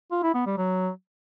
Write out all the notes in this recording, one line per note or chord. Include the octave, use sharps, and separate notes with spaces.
F4
E4
B3
G3
F#3